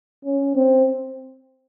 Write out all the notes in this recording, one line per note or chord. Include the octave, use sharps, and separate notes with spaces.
C#4
C4